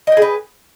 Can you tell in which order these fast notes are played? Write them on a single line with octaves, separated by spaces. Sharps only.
D#5 G5 G#4 B4